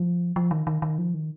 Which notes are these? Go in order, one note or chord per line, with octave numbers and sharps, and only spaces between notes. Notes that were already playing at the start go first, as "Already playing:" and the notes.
Already playing: F3
F3
D#3
D#3
D#3
F3
D#3